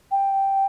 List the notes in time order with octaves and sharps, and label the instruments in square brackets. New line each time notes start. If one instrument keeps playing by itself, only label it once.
[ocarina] G5